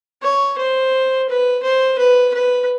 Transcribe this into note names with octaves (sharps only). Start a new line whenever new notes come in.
C#5
C5
B4
C5
B4
B4